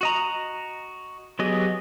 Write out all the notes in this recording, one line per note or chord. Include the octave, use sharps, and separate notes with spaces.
F#4 D#5 A#5
F#3 B3 G4 G#4 D#5